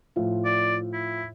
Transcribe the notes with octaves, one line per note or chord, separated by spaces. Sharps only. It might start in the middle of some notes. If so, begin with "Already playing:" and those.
A2 F3 F4
D5
E4